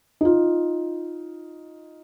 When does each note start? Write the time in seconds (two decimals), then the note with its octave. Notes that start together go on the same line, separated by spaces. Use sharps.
0.21 D#4 F4